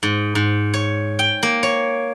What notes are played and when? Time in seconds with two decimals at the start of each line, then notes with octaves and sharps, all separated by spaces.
0.03 G#2
0.35 G#2
0.74 C#5
1.19 G5
1.43 A#3
1.63 C#5